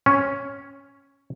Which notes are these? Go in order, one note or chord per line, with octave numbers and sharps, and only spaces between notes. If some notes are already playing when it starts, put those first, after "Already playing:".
C#4